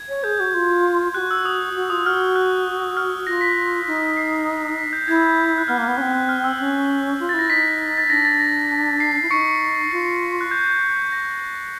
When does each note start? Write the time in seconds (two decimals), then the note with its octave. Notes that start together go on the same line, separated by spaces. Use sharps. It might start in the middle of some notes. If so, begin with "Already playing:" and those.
Already playing: G#6
0.09 C#5
0.24 G#4 G6
0.40 F#4
0.54 F4
1.14 G4 F#6
1.18 F#4
1.31 E6
1.45 D#6
1.76 F#4
1.90 F4 D#6
2.06 F#4 F6
2.36 F#6
2.97 F6
3.26 F4 A#6
3.41 B6
3.87 D#4
4.17 C7
4.78 B6
4.93 G6
5.08 E4 G#6
5.22 G6
5.58 F#6
5.68 B3 F6
5.78 A#3
5.83 F6
5.88 B3
5.98 C4 C#4 F#6
6.14 F#6
6.29 F6
6.44 E6
6.59 C#4 F#6
7.20 F4
7.29 E4 A6
7.39 A#6
7.50 D#4 B6
7.98 A6
8.10 D4 A#6
8.25 A6
8.40 A#6
9.00 C7
9.15 C7
9.22 E4
9.30 D#4 C#6 C#7
9.91 F4 C7
10.41 F#6
10.51 G6
11.12 A#6